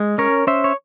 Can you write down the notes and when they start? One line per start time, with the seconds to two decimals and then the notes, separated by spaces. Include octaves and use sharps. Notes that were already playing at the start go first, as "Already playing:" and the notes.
Already playing: G#3
0.18 C#4 A#4 C#5
0.47 C#4 C5 E5
0.64 C#5